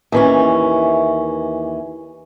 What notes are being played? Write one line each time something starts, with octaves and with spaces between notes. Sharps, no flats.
D#2 E3 C#4